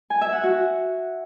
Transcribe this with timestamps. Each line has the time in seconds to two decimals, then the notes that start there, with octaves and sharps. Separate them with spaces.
0.10 G#5
0.21 E5
0.32 F#5
0.43 F#4